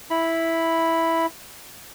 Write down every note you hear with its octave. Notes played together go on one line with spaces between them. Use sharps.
E4 B5